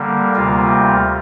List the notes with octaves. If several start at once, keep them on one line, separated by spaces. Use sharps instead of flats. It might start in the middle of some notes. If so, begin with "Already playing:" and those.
Already playing: D3 G3 A#3
D2 C3 G3 A#3 F4